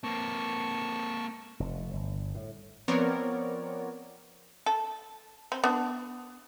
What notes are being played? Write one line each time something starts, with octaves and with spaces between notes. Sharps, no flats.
A#3 C4 A5 C#6
F1
G1
A2
F3 B3 C4 A#4 C#5 D5
A4
C4
B3 D4